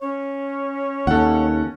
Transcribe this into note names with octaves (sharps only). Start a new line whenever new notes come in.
C#4 C#5
D#2 A4 F#5